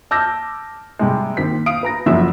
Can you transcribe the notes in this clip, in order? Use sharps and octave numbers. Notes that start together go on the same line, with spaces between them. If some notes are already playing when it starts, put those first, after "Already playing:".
A5 D6 E6 F6 G6 A#6
C3 G3 G#3
D#2 C4 B6
F5 D#6 D7
B4 A#5 A#6
F#1 F3 F#4 E5 E6